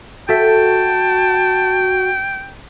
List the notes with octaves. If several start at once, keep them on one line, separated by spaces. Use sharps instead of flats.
F#4 A4 E5 G5 A5